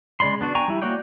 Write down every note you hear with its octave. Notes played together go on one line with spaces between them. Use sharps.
C#3 G#3 D5 B5 C6
B3 D4 F#4
G5 G#5 A#5 C#6
G3 E4
A#3 F#4 C#5 D5 G5